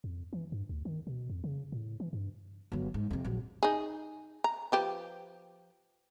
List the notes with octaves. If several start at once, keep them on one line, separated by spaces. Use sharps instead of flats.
F2
E3
G2
D2
D#3
B2
F2
C#3
A2
E3
G2
G1 F#3
G#2
F2 C3
A#1 F#3
D#4 G#4
A#5
F3 G4 B4